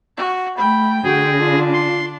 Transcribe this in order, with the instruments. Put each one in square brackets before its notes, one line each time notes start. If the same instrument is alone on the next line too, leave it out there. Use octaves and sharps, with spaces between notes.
[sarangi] F#4
[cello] A3 [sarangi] G5 [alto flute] B5
[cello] D3 [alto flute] F#4 [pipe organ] G#4
[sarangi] D4 [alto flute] F4
[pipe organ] C6